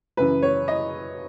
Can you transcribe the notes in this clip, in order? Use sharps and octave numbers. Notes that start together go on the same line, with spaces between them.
F#2 C#3 E3 B4
C#5
D#5